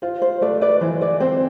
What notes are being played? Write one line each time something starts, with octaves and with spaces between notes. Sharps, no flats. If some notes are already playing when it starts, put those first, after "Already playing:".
F4 C5
C5
A3 B4 D5
B4 D5
E3 C5
B4 D5
C4 C5